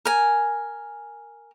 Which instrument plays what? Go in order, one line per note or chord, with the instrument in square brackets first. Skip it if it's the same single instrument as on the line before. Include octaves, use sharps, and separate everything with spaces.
[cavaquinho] A#4 G#5